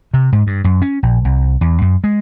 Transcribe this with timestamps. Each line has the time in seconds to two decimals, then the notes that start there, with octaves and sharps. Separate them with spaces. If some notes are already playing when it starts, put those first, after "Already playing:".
0.14 C3
0.32 G#2
0.47 G2
0.64 F#2
0.82 C#4
1.03 A#1
1.25 C2
1.61 E2
1.82 F#2
2.04 G#3